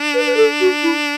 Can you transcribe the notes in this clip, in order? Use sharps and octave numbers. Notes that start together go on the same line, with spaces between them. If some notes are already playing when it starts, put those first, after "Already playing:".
Already playing: D4
B4
B4
A4
F#4
E4